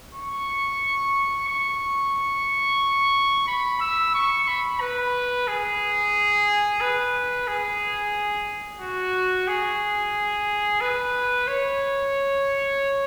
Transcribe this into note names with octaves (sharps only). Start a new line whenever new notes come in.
C#6
C#6
B5
E6
C#6
B5
B4
G#4
B4
G#4
F#4
G#4
B4
C#5